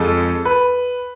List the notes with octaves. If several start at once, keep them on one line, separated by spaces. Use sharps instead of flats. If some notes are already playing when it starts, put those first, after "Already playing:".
Already playing: F2 F3 G#3 A4
B4